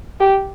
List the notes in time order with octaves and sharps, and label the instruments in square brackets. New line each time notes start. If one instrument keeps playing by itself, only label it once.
[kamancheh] G4